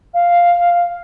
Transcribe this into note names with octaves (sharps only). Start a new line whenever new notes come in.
F5